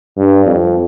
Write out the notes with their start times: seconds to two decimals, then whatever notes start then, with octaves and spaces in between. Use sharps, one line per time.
0.17 G2
0.46 F2